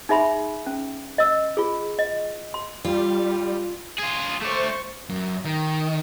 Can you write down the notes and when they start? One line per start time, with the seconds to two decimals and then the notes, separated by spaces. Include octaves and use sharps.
0.09 D#4 G#4 E5 B5 C6
0.66 C#4
1.18 D#5 E6
1.57 F4 G#4
1.99 D#5
2.54 C6
2.85 G3 F4
3.99 F4 G#4
4.43 A3 C5 D5 C#6
5.09 F#2
5.44 D#3